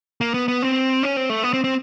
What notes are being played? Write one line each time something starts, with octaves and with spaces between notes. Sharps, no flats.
A#3
B3
B3
C4
C#4
C4
A3
B3
C4
C4